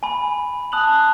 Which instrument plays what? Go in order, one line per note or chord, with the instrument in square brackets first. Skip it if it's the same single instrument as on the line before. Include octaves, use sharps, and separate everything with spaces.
[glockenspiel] G#5 B5
A5 D#6 F#6 F7 F#7